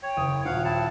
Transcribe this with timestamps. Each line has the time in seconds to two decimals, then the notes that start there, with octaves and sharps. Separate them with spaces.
0.03 C#5 G5
0.17 F#1 D#6
0.45 D#1 F#4 F5 F#5
0.64 C4 E4 A5